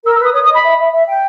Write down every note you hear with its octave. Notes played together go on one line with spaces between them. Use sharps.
A#4 E6
E6
B4 D#6
C#5 D#6
D#6
D#5
B5
E5
E5
E5
G5